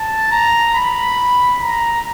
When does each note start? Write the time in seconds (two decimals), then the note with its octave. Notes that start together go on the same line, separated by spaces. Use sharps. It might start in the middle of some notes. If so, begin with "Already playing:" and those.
Already playing: A5
0.31 A#5
0.74 B5
1.60 A#5